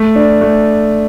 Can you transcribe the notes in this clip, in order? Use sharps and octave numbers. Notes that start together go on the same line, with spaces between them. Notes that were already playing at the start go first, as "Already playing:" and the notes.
Already playing: A3
D4
A3